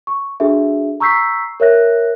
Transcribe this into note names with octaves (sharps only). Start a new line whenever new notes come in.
C#6
D4 F#4 G#4 A4 E5
A#5 C#6 E6 G6 B6 C7
A#4 C#5 E5 F#6 A#6